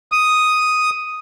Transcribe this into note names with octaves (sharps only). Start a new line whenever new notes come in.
D#6